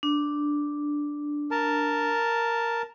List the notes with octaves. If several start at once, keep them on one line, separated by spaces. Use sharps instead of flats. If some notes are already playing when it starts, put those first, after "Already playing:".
D4
A#4 A5